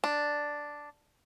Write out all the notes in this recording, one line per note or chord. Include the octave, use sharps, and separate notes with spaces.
D4